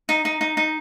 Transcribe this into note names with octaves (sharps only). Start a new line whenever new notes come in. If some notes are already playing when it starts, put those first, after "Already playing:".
D#4
D#4
D#4
D#4